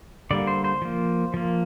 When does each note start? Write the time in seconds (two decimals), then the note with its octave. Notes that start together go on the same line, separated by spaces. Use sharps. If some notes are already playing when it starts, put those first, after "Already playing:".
0.31 D3 G3 A#3 D5
0.47 C5
0.64 C5
0.82 F3 A#3
1.34 F3 A#3